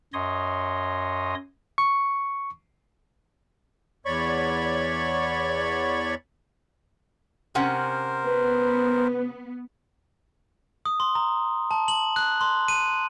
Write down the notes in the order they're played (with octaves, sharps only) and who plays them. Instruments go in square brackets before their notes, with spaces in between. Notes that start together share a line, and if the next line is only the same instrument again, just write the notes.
[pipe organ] F#2 C#5 D#5 C6 D#6
[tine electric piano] C#6
[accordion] E2 C#5 D5 B5 C#6
[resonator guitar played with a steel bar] C3 C#4 F#5 [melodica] A#4 C5
[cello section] B3 [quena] B4
[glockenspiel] D#6
C6
A#5
A5
F#7
F#6
C6
D#7